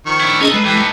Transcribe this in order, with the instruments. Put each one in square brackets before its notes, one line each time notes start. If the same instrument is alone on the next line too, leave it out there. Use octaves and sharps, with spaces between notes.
[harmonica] D#3 F3 C#6
[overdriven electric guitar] D4 E4
[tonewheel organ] C#4 G#4 D#5 [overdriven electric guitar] D#4 A4
[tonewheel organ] G#3 [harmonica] B4
[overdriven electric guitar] E3 [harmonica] G4 A4 B4
[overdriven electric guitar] A3 D#4